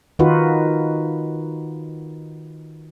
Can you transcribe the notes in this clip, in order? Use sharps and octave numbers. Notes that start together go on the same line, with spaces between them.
D#3 D#4 F4 F#4 B4